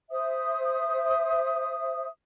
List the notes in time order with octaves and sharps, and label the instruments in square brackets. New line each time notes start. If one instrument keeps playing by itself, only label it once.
[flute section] C5 E5 D#6